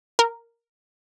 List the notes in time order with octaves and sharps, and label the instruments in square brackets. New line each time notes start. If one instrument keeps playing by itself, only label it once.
[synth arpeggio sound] A#4